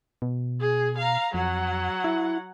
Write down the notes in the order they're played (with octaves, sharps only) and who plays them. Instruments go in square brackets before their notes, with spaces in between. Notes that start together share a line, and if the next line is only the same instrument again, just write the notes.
[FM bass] B2
[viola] G#4
F5 A#5
[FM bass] F2 [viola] F#3 F#5
[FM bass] E4